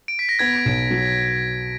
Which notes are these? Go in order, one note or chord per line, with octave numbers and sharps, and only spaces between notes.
D7
B6
A#6
B3 G#6
B1
F#3